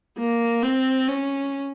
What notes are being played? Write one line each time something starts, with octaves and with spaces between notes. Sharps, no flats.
A#3
C4
C#4